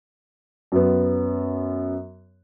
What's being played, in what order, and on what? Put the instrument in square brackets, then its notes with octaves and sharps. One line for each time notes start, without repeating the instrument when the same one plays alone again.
[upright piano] F#2 B3